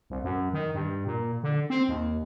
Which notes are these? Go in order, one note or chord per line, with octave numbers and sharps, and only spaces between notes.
C2
F#2
D#3
G2
A#2
D3
C4
D#2